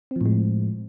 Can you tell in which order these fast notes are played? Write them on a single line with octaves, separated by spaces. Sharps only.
C4 F3 A2 G#3